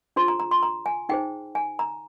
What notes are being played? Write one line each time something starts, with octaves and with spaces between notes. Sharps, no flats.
D4 F4 G#4 C5 C6
A#5
A#5
C6
A#5
G#5
D#4 G#4 C5 G5
G#5
A#5